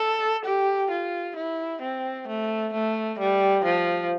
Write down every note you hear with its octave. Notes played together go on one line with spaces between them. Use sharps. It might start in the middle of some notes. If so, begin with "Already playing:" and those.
Already playing: A4
G4
F4
E4
C4
A3
A3
G3
F3